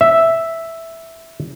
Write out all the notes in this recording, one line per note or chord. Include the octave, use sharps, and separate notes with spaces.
E5